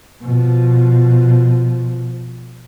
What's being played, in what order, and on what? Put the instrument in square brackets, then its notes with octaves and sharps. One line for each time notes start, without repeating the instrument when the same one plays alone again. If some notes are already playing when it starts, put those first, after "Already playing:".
[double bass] B2 F3